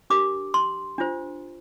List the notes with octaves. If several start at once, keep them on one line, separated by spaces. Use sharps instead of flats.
D4 G4 A#4 D6
C6
D4 F4 C5